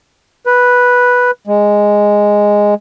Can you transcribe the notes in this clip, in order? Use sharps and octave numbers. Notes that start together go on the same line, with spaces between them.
B4
G#3